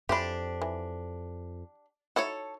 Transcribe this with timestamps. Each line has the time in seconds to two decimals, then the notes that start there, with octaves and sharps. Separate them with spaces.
0.09 F2 E3 D4 G4 C5 B5
0.62 E3
2.16 D#4 E4 F#4 A4 C#5